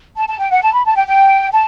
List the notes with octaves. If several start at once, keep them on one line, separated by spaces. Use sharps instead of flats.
A5
A5
G5
F#5
A5
B5
A5
G5
G5
A5